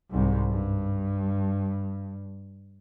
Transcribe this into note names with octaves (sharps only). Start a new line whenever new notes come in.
C2 G#2
G2